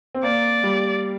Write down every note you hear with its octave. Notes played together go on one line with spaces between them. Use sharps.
C4
A#3 D5
G3